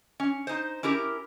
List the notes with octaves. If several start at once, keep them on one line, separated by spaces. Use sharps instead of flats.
C#4
D#4 C5
C#4 E4 G4 A#4